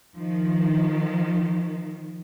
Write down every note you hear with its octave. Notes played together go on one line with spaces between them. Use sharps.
D#3 F3